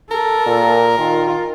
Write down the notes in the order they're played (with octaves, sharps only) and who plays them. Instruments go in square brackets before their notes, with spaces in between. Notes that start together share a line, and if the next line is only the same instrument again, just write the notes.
[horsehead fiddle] A4 [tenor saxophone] A#4
[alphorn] A#2
[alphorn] D#3 [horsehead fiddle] F4